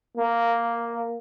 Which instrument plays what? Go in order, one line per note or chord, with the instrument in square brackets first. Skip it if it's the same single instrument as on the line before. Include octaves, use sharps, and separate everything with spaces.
[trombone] A#3